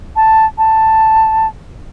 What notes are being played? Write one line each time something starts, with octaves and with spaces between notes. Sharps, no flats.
A5
A5